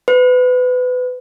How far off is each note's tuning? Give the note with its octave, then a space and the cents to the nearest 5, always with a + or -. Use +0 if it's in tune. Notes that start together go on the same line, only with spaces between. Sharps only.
B4 +25